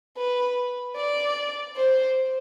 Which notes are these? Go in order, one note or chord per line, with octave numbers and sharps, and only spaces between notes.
B4
D5
C5